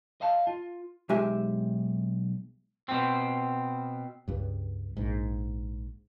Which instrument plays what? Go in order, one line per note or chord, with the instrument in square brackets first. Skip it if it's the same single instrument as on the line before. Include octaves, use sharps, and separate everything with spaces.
[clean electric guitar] D#5 F5 A5
F4
[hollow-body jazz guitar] B1 G#3 G4 E5 G#5
[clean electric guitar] B2 C4
[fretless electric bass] C#2 G2
A#1 G#2